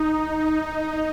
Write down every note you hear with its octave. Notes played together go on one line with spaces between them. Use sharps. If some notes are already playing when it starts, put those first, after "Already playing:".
Already playing: D#4
D#4